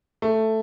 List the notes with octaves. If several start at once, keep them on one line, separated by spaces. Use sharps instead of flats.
A3